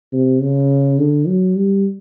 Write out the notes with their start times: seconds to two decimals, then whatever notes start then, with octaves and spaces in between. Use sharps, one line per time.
0.13 C3
0.41 C#3
0.99 D3
1.27 F#3
1.56 G3